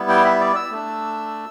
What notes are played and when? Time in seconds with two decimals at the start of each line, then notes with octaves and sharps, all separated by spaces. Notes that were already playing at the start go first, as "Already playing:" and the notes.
Already playing: G3 B3 E4
0.09 G5
0.24 E5
0.40 D5
0.55 E6
0.72 A3 D4